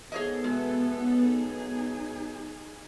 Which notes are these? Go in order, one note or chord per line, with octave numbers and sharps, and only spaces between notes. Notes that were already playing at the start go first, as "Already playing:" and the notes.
G#2 B3 G#4 A4 C#5 D#5
B2 G#3 G#4 E5
B1 D#4 G#4